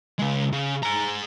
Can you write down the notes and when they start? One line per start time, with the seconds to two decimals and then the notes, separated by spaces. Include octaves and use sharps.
0.19 C#3 G#3
0.52 C#3
0.83 G#4 A#5